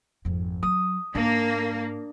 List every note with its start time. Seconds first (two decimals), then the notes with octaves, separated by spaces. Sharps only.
0.25 G#1 F2
0.63 F#3 D#6
1.15 G#2 A#3 D4